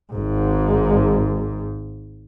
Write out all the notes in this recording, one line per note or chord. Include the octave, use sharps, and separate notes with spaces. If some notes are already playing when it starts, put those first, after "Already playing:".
G#1 G#2